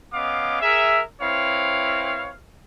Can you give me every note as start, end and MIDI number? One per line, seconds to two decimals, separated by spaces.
0.13 0.57 59
0.13 0.57 61
0.13 0.57 75
0.13 0.57 77
0.13 0.57 86
0.61 1.01 68
0.61 1.01 70
0.61 1.01 76
1.21 2.33 60
1.21 2.33 64
1.21 2.33 71
1.21 2.33 73
1.21 2.33 77